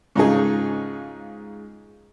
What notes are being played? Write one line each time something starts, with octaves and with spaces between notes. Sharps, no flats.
G#2 C#3 D#4 F4 G#4